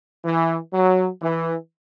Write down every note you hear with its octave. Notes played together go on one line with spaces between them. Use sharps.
E3
F#3
E3